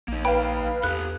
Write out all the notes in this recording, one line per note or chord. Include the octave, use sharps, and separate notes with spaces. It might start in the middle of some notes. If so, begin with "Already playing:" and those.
A#1 A#3 D#4
B4 F5 G5
E2 G4 A4 F#6